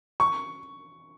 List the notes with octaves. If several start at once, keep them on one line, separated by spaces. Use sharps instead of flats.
C#6